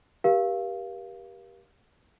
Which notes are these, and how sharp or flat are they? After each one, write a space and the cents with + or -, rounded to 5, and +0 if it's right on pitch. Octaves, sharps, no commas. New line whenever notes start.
G4 +0 A#4 +35 F5 -15